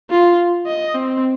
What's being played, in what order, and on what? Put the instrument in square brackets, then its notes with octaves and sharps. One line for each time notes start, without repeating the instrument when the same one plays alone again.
[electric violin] F4
D#5
C4